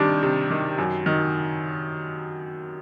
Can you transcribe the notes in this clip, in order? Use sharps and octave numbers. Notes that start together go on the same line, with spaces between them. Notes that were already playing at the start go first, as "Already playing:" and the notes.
Already playing: C3 D#3 G3 D4
C3
D#3
F#2
D#3